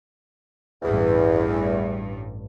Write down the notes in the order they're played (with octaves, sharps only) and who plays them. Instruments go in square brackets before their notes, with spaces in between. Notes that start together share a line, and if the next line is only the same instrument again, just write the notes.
[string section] A1 G2 [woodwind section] E2